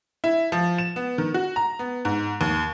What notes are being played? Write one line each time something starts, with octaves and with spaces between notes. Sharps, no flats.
E4
F3
E7
B3
D#3
F#4
A#5
B3
G#2
D#2